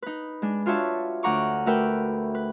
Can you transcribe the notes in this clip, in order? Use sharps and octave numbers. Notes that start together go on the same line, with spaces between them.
D#4 B4
G#3 D4
D4 F4 F#4 C#5 E5 A5
D2 F#5 A#5 C#6 D6
A3 F#4 A#4 B4 E5 G5
B4